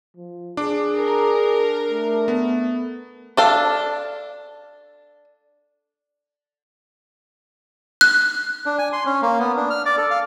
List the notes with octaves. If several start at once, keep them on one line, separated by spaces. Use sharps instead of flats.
F3
D4 G#4 D6
A#4
A3
B3
D4 A4 F5
F#6
D4
G#5
C6
C#4
A#3
B3
D4
F6
D5
A4
F5